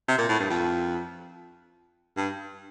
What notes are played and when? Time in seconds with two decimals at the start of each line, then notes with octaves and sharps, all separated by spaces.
0.08 C3
0.18 A#2
0.29 A2
0.39 G2
0.50 F2
2.17 G2